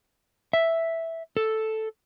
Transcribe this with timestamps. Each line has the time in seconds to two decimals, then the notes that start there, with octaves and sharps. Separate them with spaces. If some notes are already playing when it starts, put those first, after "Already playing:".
0.53 E5
1.37 A4